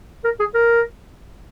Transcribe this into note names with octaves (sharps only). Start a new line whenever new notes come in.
A#4
G#4
A#4